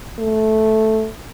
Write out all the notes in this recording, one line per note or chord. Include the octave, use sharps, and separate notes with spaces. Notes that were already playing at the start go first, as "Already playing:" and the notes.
A3